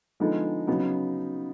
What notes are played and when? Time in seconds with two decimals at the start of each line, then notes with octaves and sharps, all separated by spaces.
0.20 D3 F3 G#3 B3 D#4
0.67 C#3 F#3 B3 D#4